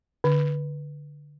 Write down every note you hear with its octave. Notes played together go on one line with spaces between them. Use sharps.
D3